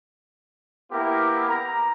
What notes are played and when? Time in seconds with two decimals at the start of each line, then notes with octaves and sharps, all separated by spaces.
0.92 A#3 B3 E4 G4 A#4
1.48 A#5